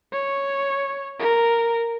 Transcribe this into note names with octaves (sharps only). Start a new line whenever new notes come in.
C#5
A#4